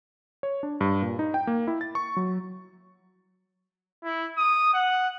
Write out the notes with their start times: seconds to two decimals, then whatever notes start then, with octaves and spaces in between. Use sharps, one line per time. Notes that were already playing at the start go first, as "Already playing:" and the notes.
0.43 C#5
0.63 D4
0.81 G2
1.02 A#2
1.19 D#4
1.34 G5
1.47 A#3
1.68 E4
1.81 A6
1.95 C#6
2.17 F#3
4.05 E4
4.37 D#6
4.74 F#5